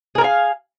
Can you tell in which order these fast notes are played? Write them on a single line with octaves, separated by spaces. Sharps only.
G#4 A#4 G#5 F5